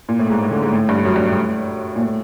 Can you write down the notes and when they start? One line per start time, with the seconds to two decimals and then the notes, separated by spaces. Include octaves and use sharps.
0.09 A#2
0.19 A2
0.30 G#2
0.41 A2
0.51 D3
0.62 G#2
0.72 A2
0.89 G2
1.05 F#2
1.16 G2
1.26 A2
1.96 A#2
2.01 A2